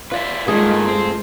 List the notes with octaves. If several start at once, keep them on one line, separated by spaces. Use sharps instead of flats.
F4 B4 D5 E5
G2 A#2 D#3 G#3 A3 F4 G#4
C4 C5